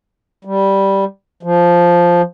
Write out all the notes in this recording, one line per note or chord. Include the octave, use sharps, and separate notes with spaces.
G3
F3